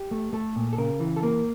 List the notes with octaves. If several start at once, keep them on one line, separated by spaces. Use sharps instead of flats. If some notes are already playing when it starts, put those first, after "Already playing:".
Already playing: G4
A3
A3 A4
A#2
A4
C#3 A#4
E3
A4
A#3 A#4